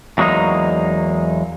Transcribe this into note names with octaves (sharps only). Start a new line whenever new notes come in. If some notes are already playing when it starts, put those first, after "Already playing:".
E2 F#3 G#3 A#3 D#4